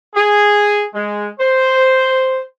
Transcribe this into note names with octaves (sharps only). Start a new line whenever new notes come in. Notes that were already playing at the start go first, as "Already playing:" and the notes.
G#4
G#3
C5